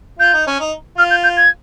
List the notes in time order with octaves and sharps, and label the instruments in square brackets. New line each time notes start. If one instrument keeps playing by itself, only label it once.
[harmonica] F4 [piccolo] G6
[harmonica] D#4
C#4
D#4
[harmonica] F4 [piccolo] F6
[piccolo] G6
G6
G#6